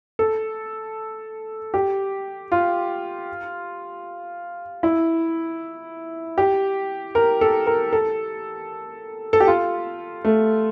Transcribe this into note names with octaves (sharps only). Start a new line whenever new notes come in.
A4
G4
F4
E4
G4
A#4
A4
A#4
A4
A4
G4
F4
A3